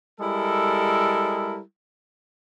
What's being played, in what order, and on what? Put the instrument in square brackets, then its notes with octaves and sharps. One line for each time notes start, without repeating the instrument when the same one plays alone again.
[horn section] G3 G#3 E4 A4 A#4